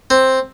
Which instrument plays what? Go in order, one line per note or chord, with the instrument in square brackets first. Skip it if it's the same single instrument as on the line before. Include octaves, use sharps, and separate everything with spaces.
[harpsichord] C4